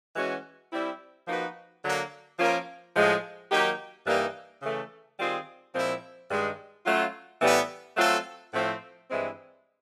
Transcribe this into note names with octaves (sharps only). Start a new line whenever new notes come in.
E3 G#3 C#4 F#4
G3 C4 E4
F3 A#3 D#4 F#4 B4
D3 F#3 A#3
F3 A#3 C#4 F4 A#4
A2 F3 G#3
D#3 F#3 A#3 D#4 G4
G2 E3 G3 A#3 D#4
C#3 E3 A3
D#3 G3 C4 F4 G#4
A#2 F3 G#3 C4 E4
G2 D#3 G#3
F#3 A3 C#4 F4
A2 E3 G3 B3
F#3 A3 C4 F4 A4
A2 F3 A3 C4
G2 E3 G#3 C4 E4